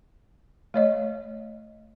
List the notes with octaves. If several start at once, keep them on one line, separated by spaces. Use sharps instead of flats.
A3 C#5 D#5